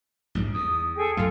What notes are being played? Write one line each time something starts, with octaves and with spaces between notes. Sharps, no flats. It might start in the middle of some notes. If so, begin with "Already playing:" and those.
A#1 G#2 G3
E2 D#6
G#4 A4 G5
F#2 F#3 A3 F4 A4